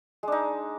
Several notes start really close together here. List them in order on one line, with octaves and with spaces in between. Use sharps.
G#3 D4 D#4